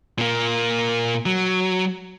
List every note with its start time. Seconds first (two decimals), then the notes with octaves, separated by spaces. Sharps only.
0.18 A#2 A#3
1.26 F#3